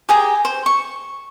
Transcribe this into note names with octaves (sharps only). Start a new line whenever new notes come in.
G4 G#4 G#5 A#5
C5
C#6